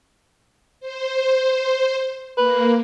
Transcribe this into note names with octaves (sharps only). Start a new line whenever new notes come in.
C5
A#3 B4